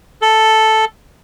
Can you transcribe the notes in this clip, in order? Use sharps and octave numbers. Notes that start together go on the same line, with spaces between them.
A4